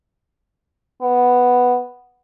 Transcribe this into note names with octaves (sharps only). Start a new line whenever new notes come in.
B3